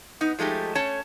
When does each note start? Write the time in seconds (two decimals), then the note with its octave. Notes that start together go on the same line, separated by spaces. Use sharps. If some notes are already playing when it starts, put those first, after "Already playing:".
0.21 B3 D#4
0.39 F3 G#3 A3 D#4 G4
0.75 A3 C#4 C#5 A5